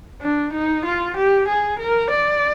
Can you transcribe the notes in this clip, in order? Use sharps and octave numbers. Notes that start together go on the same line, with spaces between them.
D4
D#4
F4
G4
G#4
A#4
D5